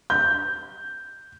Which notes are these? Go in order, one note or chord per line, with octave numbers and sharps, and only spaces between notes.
G6